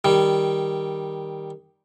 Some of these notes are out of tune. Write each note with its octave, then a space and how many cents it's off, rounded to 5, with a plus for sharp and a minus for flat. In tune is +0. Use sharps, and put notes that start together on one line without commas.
D#3 +0 G3 +0